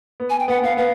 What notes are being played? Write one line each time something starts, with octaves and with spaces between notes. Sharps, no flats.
B3
G#5
G5
B3 F#5
B3 F5
B3 F5